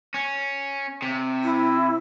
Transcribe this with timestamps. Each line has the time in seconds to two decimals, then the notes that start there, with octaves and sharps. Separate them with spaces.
0.14 C#4
1.02 C3
1.44 E4